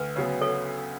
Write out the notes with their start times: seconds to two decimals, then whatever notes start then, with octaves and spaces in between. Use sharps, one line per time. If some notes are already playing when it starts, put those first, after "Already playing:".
Already playing: D2 B4
0.16 C#3 F#3 B3
0.41 A4 C#5